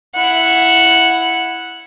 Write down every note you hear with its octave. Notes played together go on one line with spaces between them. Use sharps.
E4 F#5